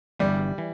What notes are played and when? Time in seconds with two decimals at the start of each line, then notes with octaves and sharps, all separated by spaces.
0.19 G1 G2 E3 G3
0.58 E3